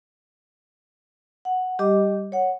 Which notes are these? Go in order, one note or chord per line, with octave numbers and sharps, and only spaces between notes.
F#5
G3 G4 D#5 D6
C#5 F#5